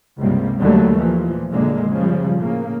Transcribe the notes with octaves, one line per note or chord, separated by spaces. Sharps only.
C#2 G2 C3 G3 A#3
D#2 D3 F#3 G3 A3
A#2 E3 F3
A#1 F#2 A#2 D3 G#3 A#3
C#3 F3 G3
A2 C#3 A#3